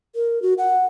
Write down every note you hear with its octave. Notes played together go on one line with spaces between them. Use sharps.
A#4
F#4
F#5